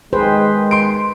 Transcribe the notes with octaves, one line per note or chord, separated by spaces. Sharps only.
D#3 G#3 G#4 B4 C5 G5
C6 D7